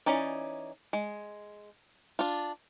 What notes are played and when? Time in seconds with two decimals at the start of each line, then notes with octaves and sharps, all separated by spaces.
0.06 E3 C#4 D#4 D5
0.93 G#3
2.19 D4 F4